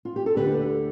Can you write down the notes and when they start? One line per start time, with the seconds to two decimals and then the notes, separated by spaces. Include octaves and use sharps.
0.05 F4
0.16 G4
0.26 A4
0.36 D2 D3 G4 B4